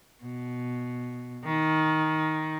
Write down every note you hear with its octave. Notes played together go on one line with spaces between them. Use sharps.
B2
D#3